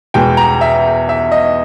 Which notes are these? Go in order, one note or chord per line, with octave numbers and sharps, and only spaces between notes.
E2 B2 G#3 G5
A#5
E5
E5
D#5